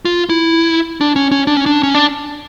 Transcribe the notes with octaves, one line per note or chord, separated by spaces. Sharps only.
F4
E4
D4
C#4
C#4
D4
C#4
D4
C#4
D4